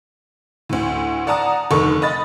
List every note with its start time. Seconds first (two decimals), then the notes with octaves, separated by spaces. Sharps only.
0.69 D2 A2
1.27 D5 F#5 A5 A#5 D#6
1.71 F1 D3 D#3 A4 C#6
2.02 D#5 B5 A6